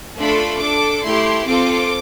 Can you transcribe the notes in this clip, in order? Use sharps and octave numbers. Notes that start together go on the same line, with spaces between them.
A3 D4 F4 A4 B5
D4 A4 D6
A3 E4 G4 C6
C4 F4 A4 D6